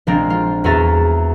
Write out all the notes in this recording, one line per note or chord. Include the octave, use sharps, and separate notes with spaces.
A#1 F3 G#3 C4 D4 A#5
F4
E2 F#4 G#4 E5 A#5 A6